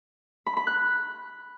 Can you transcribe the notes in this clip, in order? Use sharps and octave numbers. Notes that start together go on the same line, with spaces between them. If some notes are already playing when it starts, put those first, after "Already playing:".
B5
B5
F#6